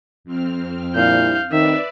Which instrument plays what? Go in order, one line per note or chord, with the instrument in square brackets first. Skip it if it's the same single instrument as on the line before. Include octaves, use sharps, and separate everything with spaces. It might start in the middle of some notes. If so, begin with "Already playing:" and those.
[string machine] F2 C4 F6
[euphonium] A#2 [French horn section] G3 D4 E4 [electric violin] F5 G6
[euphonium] D#3 [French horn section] A3 C4 D#4 [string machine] B4 D5 [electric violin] E5